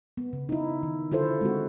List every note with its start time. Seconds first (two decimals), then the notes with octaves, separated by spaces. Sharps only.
0.17 B3
0.33 C#3
0.49 D#4 E4
0.83 D#3
1.11 D3 E4 F4 A4 C5
1.41 G#3 C4 F#4